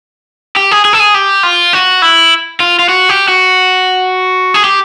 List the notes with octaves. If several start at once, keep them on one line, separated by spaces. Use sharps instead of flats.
G4
G#4
G#4
A4
G#4
G4
F4
F#4
E4
F4
F4
F#4
G4
F#4
G#4
G4